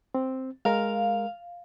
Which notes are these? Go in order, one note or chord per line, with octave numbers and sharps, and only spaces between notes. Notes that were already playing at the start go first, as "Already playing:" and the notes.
C4
G#3 A#4 F5